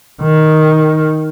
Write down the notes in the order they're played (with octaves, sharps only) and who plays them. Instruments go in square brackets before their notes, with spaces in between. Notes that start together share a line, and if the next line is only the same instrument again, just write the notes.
[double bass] D#3